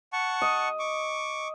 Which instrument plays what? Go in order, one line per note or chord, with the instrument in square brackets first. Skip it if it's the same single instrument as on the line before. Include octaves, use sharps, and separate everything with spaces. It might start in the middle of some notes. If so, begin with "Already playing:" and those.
[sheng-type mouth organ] F#5 A5 C#6
[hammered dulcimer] D#5
[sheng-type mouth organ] C#6 D6